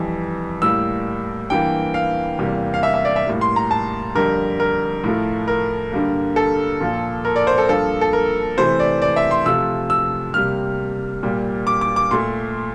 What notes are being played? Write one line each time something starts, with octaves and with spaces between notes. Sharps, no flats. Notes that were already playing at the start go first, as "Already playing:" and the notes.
Already playing: F2 E3 G3
A2 G3 A#3 E6
G2 E3 A#3 G5
F5
E2 C3 G3 A#3
F5
E5
E5
D5
E5
A2 G3 A#3
C6
A#5
A5
F2 D3 G3 A#3 A#4
A#4
A2 F3 A3
A#4
G2 D3 G3 A#3
A4
A#2 F3 A#3
A#4
D5
C5
A4
G2 F3 A#3 A4
A4
A#4
C3 E3 A3 C5
D5
D5
E5
C6
C3 F3 A3 E6
E6
C3 G3 A#3 F6
A#2 G3 A#3
D6
D6
D6
A#2 A3 C6